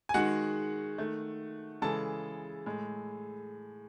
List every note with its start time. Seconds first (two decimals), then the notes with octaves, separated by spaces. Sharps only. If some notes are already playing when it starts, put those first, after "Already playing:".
0.09 G#5
0.14 D#3 G#3 F#4 F#5
0.98 D#3 A3
1.82 C#3 E3 G#3 A4 A5
2.66 A2 G#3